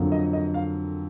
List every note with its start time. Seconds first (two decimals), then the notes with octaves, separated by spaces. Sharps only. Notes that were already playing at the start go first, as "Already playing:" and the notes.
Already playing: F2 D3 F#3 A#3 F4
0.12 D#5
0.33 D#5
0.54 F5